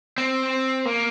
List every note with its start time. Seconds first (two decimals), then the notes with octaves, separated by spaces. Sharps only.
0.18 C4
0.85 A#3